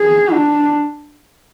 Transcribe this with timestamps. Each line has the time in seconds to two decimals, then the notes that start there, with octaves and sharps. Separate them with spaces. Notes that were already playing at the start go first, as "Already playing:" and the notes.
Already playing: G#4
0.32 D4